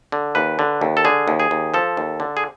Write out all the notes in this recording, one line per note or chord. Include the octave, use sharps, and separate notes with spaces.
D3
D#2 B4
D3
D#2
A4
D3 G#4
D#2
G#4
D#2
F3 A4
D#2
D3
G#4